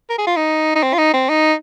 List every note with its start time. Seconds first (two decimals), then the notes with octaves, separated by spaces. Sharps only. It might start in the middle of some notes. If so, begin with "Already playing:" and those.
0.09 A#4
0.18 G#4
0.27 F4
0.36 D#4
0.75 D#4
0.83 C4
0.94 F4
0.98 D#4
1.13 C4
1.29 D#4